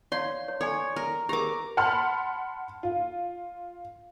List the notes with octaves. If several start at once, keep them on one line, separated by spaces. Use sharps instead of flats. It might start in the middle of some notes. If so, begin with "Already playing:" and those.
C#5 D5 F5 C6
C#5
A4 C#5 D5 G#5
A#4
G4 G#4 A#4 A#5 D6
F#5 A5 B5 C6 F6
F4